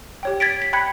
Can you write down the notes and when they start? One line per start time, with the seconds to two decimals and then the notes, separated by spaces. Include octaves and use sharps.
0.23 G4 C#5 G5
0.40 G#6 A6 B6 D7
0.62 B6
0.73 G5 B5 F#6 G#6 B6 C#7